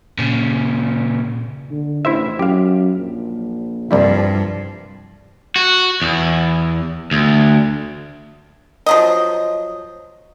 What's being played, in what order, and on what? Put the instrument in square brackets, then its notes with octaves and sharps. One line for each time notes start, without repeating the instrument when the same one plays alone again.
[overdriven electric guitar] A#2 C#3
[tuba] D3
[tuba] A1 [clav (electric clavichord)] E4 C5 E5
[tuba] F#2 [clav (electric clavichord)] G4 F5
[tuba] A#1
[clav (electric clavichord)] C2 G3 E4 [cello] G2 F3
[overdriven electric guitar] F#4
E2
D2
[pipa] F3 F#3 D#5